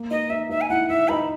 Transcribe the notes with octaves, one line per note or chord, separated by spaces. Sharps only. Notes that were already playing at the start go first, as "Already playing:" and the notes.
Already playing: A#3
D#4 D#5
D#4 E5
D#4 E5
G#5
E4 F#5
E4 E5
D#4 B5